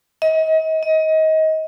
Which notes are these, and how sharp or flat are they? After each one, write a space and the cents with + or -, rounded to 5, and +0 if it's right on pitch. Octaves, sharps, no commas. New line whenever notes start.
D#5 +35
D#5 +25